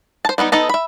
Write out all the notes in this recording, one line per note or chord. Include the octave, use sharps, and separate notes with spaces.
C5 A5
G3 B3 C4 D#4
B3 D#4 A4 D#5 A5
E5 B5